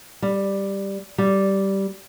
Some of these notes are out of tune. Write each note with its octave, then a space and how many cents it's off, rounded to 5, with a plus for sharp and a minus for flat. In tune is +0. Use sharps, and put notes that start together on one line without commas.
G3 +5
G3 -10